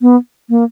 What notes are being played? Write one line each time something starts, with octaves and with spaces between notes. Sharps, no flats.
B3
A#3